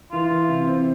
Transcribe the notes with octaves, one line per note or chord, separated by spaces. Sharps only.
E3 F4
E3
C3
C4